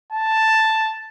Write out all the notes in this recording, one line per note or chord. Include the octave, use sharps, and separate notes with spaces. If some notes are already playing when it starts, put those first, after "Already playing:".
A5